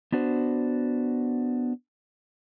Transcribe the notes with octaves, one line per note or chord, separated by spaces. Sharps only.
B3 D4 F#4 C5